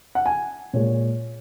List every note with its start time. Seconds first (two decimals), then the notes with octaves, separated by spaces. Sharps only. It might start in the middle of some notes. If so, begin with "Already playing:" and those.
0.15 F#5
0.26 G#5
0.73 A#2 G#3 C#5